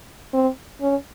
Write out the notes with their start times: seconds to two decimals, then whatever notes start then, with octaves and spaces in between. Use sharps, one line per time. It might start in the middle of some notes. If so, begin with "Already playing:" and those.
0.34 C4
0.81 C#4